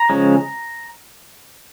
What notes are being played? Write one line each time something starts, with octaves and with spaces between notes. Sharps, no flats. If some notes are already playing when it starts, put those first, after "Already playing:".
Already playing: A#5
C#3 F3 G#3 C#4